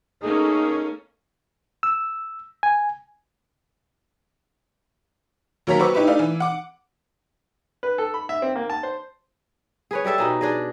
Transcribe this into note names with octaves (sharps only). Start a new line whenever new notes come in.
A3 A#3 C#4 D#4 G#4
E6
G#5
D#2 F#3 A#3 C#5 A#5 B6
F#4 B4 C5 C#6 D6 E6
D#4 E4 G4 B4
A3 D4 D#4 F5
E3
F#5 D6
B4
A4
B5
E5
C4
A#3
A5
C5
G#4 B4 C#5
G3 G4 A4 E5
B2 D#4 G#4
D4 G#4 D#5